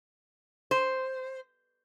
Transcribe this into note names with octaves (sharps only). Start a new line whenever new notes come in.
C5